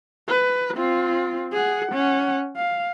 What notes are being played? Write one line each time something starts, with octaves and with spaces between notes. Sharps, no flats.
B4
C4 F4
G#4 F#5
C#4 F#5
F5